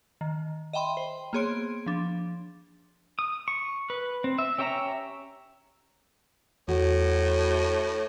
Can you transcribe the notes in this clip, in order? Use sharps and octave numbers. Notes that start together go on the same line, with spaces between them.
D#3
D#5 E5 G5 B5 C6
C5
A#3 B3 G#4 C#5 C6 D7
F3 D4
D#6
C#6
B4
C4
E5
C#4 G4 C#5 E5 A#5
E2 A2 F#4